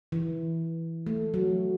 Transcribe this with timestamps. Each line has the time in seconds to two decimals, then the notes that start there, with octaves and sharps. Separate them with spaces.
0.12 E3
1.07 A3
1.34 F#3